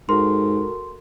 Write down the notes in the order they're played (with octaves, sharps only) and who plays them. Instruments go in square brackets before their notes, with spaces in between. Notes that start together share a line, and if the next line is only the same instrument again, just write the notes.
[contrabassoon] G#2 [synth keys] F#4 A4 A#4 [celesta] C6